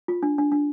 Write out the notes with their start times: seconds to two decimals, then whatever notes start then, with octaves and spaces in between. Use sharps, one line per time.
0.08 F4
0.23 D4
0.38 D4
0.52 D4